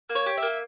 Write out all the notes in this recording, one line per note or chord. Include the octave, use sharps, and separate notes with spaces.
A#3
C#5
G4
A#3 E5